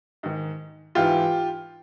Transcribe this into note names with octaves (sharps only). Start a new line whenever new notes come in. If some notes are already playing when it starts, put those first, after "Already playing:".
G#2 D#3
G#2 E3 F4 G4